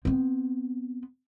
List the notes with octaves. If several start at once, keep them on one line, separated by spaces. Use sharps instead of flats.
B3 C4